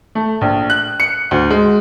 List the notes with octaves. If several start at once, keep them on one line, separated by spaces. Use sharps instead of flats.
A3
A#1
F#6
C#7
D2
G#3